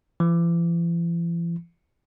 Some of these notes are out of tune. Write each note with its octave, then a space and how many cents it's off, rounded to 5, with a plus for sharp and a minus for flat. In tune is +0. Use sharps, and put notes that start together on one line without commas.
E3 +45